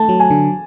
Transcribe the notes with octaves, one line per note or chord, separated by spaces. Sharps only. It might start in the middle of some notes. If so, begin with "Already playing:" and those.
Already playing: A3 A5
F#3
G#5
D3